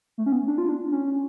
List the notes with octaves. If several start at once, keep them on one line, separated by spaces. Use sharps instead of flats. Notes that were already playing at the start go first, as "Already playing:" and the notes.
A3
C#4
B3
D4
F4
D4
C#4